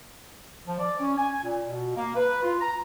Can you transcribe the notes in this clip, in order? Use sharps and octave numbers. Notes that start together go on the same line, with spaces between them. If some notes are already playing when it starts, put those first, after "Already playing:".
F3
D5
C#4
G#5
A#2
B2
A#3
B4
F4
A#5